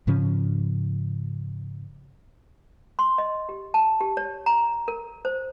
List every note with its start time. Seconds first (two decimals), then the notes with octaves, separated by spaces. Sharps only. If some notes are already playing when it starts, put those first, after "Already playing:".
0.07 G#2 C#3 F3 C#4
2.99 C6
3.18 D#5
3.49 G4
3.74 A5
4.00 G4
4.17 C#5
4.46 A#5
4.88 A#4
5.25 C5